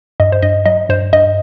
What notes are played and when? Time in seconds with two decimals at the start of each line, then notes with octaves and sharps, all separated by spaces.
0.20 G2 D#5
0.32 C5
0.42 G2 D#5
0.66 F#3 D#5
0.89 G2 C5
1.13 G2 D#5